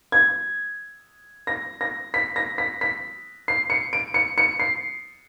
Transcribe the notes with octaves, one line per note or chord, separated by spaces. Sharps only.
G#6
A#6
A#6
B6
A#6
B6
B6
C7
C#7
D7
C#7
C#7
C7